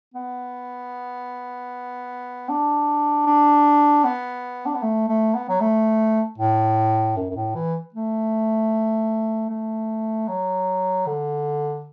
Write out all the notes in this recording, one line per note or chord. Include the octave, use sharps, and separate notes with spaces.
B3
D4
D4
B3
D4
B3
A3
A3
B3
F#3
A3
A2
F#2
F#2
A2
E3
A3
A3
F#3
D3